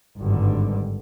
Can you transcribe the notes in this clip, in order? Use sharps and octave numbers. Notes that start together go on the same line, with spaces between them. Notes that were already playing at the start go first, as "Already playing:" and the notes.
G#1 G2 D3